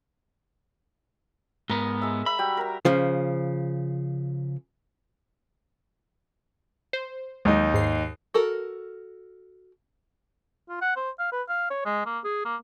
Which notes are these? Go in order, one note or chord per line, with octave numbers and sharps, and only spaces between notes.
G#2 B3 A#4
G#3 E5
E5 B5
G3 F#4 G5
A#4 A#5
C#3 F3
C5
D#2 F#3 G#3 D#4
G#2 C7
F#4 A4 A#4
F4
F#5
C5
F5
B4
F5
C#5
G#3
A#3
G#4
A#3